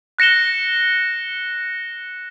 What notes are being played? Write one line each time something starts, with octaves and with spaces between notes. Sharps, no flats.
F#6 A#6 C#7 E7 G7